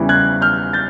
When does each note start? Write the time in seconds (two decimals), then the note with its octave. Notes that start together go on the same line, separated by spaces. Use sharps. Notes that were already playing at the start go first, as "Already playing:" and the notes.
Already playing: E2 C#3 E3 G3
0.09 F#6 G#6
0.42 F6 G6
0.73 G6 A6